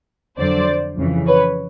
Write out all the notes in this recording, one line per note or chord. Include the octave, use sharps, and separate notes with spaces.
F2 D3 F#3 C5 D5
F2 C#3 E3
B4 C#5